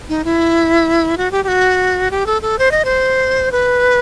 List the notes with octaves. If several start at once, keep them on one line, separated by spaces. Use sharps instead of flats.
D#4
E4
F#4
G4
G4
F#4
G4
A4
A4
C5
D#5
C5
B4